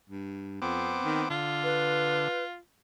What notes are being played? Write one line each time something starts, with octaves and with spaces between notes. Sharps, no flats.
G2
F2 B3 C4 D6
D#3
D3 F4
B4